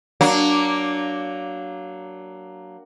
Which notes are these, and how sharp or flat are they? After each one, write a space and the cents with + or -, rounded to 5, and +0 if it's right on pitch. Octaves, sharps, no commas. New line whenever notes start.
F#3 +15 A#3 +0 D4 +0